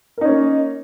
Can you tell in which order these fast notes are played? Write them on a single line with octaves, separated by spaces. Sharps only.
A#4 D#4 C#4 A#3